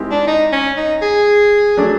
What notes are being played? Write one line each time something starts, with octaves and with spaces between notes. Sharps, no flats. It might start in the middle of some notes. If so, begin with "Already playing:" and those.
Already playing: D#3 G#3 C4 E4 G4
D4
D#4
C#4
D#4
G#4
F#3 A3 D4